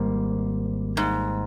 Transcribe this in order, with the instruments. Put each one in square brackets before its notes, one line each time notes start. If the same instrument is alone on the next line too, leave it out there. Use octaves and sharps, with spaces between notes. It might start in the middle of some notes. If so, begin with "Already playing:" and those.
Already playing: [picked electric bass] G#1 G3 A#3 [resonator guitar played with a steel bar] G#2
[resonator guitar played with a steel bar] G#2